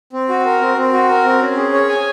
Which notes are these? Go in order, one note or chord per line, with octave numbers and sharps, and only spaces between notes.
C4
F#4
A#4
C4
C4
F#4
A#4
C4
C#4
G#4
C#5
G#5